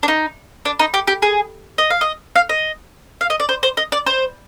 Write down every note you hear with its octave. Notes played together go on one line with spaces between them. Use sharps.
D4
D#4
D4
D#4
G4
G4
G#4
D#5
F5
D#5
F5
D#5
F5
D#5
D5
C5
C5
D#5
D5
C5